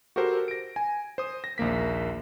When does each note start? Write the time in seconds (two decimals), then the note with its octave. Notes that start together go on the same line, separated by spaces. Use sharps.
0.16 F#4 G4 A4 A#4 C5
0.48 A#6 D7
0.76 G#5
1.18 C5 D#6
1.44 A#6
1.58 A#1 D#2 A#3 B6